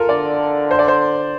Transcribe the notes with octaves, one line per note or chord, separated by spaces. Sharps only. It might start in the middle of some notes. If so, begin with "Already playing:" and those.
Already playing: F4 A4 A#4
D3 D5
C5
D5
C5